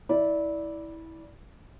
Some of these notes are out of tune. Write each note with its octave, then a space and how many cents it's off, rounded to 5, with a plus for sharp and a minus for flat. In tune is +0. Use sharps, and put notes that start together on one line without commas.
E4 -20 D5 -10